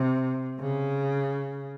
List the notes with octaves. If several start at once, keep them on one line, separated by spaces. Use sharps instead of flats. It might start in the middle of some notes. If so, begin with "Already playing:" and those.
Already playing: C3
C#3